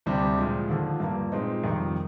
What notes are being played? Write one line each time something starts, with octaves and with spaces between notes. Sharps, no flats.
D2 C3 G3 D4 G4
A#2 F3 G#3
D#2 D3 F3
G2 F3 A#3
A#2 G#3 C4 D#4
F2 C3 D#3 G3